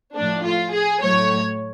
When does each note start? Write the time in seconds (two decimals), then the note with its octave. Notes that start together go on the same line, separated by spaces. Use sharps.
0.15 A2 F3 A3 D4
0.44 F4
0.72 G#4
1.02 A2 F#3 A3 C#5